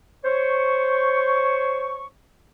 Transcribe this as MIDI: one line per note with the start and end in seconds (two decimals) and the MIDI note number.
0.25 2.06 72
0.25 2.06 73
0.25 2.06 85